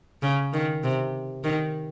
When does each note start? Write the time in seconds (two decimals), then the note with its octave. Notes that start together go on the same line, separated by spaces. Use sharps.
0.23 C#3
0.53 D#3
0.84 C3
1.44 D#3